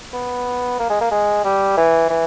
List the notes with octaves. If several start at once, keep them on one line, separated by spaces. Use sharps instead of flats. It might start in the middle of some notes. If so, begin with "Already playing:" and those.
B3
A#3
G#3
A#3
G#3
G3
E3
E3